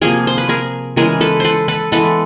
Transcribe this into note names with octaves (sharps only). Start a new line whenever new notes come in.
C3 F3 A#3 G#4 A#4
C5
B4
G#4 A#4
C#3 E3 G#3 G#4 A#4
A4 B4
A4 B4 C5
A4 B4
E3 G#3 B3 A4 B4